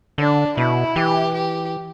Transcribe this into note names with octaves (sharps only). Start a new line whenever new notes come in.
D3 D4
B2 E4
E3 G4
G4